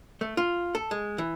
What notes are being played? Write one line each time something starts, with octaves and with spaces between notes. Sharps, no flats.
A3
F4
A4
G#3
E3